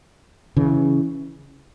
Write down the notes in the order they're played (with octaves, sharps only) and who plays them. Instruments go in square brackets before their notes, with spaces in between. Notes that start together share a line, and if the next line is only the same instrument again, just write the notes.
[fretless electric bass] C#3 E3